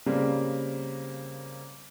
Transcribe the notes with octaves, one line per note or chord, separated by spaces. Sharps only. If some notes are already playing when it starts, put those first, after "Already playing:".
C#3 G3 A#3 C4